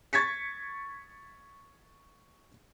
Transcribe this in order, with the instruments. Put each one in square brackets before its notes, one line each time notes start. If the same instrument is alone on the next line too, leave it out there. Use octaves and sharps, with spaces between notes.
[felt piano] C#6 G#6 A6 B6 C#7